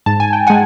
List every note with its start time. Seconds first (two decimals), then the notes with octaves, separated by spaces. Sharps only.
0.06 G#2 A5
0.20 G#5
0.33 G5
0.47 G#3 F#5 G#5